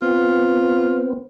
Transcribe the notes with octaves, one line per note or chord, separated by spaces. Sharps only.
B3 C4 F4